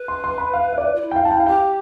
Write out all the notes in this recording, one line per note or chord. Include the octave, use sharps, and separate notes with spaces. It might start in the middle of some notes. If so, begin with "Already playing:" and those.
Already playing: B4
C6
C6
B5
F5
E5
D5
F4
E4
G5
F5
E4 A5
G5
F5
G4 G5